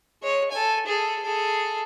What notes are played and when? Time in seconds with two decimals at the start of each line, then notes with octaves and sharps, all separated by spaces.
0.22 G#3 C#5
0.51 A4 G#5
0.86 G#4 A4
1.22 G#4 A4